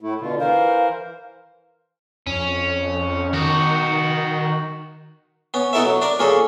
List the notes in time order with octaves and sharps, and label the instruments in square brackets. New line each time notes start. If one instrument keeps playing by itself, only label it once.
[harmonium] A2 A3 E4
B2 D3 F4
[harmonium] E3 A#4 C5 [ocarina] F5
[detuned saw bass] F2 [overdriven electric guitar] C#4
[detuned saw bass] D#3 [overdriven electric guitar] D#4 F#4
[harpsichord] B3 C#4
B3 D#4 E4 A4 A#4 E5
F#3
D4 A#4 D5
F3 A#3 C#4 G#4 A4